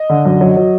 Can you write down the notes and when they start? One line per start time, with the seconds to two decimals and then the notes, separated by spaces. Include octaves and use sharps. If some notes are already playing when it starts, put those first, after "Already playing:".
Already playing: D#5
0.10 D3
0.25 F#2
0.41 F#3
0.57 F#3